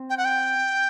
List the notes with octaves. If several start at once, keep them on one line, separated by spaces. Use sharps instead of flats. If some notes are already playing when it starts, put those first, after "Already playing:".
Already playing: C4
G5
F#5
G5